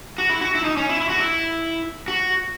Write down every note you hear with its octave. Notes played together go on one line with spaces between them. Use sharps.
F#4
E4
F#4
E4
D#4
C#4
E4
E4
F#4
E4
F#4